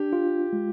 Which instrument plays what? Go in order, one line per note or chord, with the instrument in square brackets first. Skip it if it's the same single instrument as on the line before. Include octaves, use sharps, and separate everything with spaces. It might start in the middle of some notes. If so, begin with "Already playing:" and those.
Already playing: [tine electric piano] D4 [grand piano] G4
[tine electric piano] F4
G#3